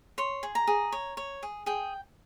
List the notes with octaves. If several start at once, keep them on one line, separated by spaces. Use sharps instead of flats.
C#5 C6
G#4
A#5
G#4
C#5
C#5
G#4
G#4 G5